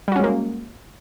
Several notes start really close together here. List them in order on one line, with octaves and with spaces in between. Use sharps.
G3 F#4 C#4 G#3 A#3